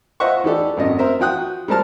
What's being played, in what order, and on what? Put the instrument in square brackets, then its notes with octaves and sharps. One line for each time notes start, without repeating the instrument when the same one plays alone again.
[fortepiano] F4 C5 D#5 E5 F#5 C#6
E3 D#4 G4 A4 D5
G#1 F#2 D#5
A#4 C5 E5
F3 F4 F#4 G5 D#6 F#6
G3 G#3 A#4 C5 A5 F6